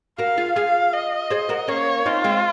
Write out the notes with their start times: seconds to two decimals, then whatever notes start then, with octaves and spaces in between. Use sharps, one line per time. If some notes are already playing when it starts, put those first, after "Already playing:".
0.18 F#4 A#4 F5
0.38 F4 G#4
0.56 F4 G#4 F5
0.93 D#5
1.30 G#4 C5
1.49 F#4 A#4
1.68 A#3 C#4 C#5
2.06 C4 D#4 F4
2.24 G#3 C4